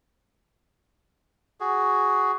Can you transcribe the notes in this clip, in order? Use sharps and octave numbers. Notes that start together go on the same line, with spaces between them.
F#4 G#4